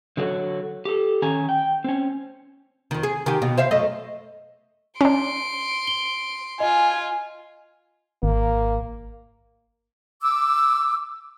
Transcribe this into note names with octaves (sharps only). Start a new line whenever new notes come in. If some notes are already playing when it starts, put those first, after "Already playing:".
D3 F#3 F#4 G#4 A4 C#5
G4 A4
D#3 C#4 G#5 A#5
G5
C4 C#4
F2 D#3
G#4
D#3 G4
B2
C5 E5 F5
F#2 A3 D#5
C#4 D4 C6 D7
G7
F4 D#5 G#5
G#1 A#3
D6 E6